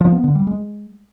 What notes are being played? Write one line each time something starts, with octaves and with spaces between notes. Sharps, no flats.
F3
B3
D3
G3
G#3